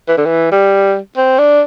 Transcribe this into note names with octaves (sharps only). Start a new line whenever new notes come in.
E3
D3
E3
G3
C4
D4